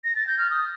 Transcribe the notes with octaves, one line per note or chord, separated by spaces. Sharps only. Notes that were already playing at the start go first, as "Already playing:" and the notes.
A#6
A6
G6
F6
D#6